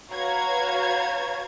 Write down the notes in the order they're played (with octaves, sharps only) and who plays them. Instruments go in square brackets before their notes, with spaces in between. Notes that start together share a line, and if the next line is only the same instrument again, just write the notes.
[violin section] F#4 B4 C#5 F5 A#5 G#6